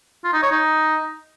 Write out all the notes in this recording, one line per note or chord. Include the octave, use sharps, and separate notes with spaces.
F4
D#4
C#5
D#4